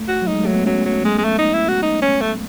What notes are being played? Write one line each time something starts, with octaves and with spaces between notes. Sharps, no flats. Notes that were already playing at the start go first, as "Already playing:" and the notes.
Already playing: A3
F#4
F#3
D#4
G#3
F#3 A3
B3
F#3 C#4
F#3
G#3
G#3
A3
D#4
E4
F#4
D#4
C#4
A3